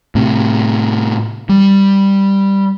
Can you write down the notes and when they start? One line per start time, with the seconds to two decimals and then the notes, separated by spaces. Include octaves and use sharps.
0.15 A2 C3
1.49 G3